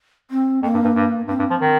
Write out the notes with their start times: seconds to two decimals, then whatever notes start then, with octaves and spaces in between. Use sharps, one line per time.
0.31 C4
0.63 F2 A#3
0.74 G2
0.84 G2
0.95 G2
1.28 G2 C4
1.39 G2
1.50 F3
1.61 D#3